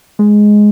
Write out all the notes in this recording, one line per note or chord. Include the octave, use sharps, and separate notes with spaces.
G#3